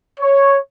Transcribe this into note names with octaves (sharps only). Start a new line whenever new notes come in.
C#5